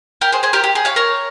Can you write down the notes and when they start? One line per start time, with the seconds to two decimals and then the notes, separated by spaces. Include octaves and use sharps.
0.21 G4 A#4
0.32 G#4 C5
0.43 G#4 C5
0.53 G4 A#4
0.64 G4
0.75 G#4
0.85 C#5 F5
0.96 A#4 C#5